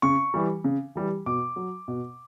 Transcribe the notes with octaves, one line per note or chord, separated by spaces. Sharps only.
C#3 C#6
E3 G3
C#3
E3 G3
B2 D6
F#3
B2